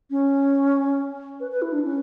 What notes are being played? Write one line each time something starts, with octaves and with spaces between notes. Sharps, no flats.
C#4
B4
B4
E4
D4
C#4